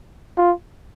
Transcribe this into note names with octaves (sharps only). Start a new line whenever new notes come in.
F4